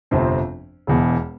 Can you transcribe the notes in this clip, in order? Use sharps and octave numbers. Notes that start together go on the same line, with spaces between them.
G1 F2 C3 F3 C4
E1 E2 B2